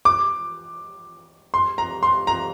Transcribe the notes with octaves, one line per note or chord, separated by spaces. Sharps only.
D6
C6
A#5
C6
A#5